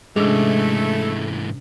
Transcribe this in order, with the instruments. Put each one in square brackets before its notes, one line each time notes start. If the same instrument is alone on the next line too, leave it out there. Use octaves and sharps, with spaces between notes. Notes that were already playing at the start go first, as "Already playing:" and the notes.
[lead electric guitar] G#2 E3 [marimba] C3 C#4 D4 [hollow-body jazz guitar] G#3 [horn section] A3